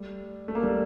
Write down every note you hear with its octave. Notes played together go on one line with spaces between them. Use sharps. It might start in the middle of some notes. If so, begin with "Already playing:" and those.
Already playing: G3 A3
A3
A#3
G3 A3